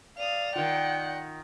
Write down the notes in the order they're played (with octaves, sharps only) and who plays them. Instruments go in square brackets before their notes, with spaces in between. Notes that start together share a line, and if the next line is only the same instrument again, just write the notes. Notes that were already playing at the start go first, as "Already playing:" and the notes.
[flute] D5 [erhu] F5 [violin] D#6 F7
[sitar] D#3 F4 [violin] F#5 [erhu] G5